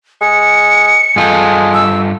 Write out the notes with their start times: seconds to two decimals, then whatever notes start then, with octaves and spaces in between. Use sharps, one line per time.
0.21 G#3 C#7
1.16 G2 G#3 F4 A4
1.74 E6